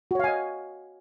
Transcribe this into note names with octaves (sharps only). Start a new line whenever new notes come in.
F#4 C#5 D#5 F5 G#5